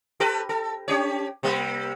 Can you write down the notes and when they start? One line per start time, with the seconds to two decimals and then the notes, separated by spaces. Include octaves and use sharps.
0.20 G4 A4 B4
0.49 A4
0.88 C#4 G4 C#5
1.43 C3 G3 A#3